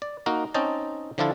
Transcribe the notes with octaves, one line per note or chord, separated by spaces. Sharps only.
D5
A#3 D#4 F#4 A#4
C4 C#4 D#4 D#5 G5 A5
D3 F3 D4 E4 F4 A4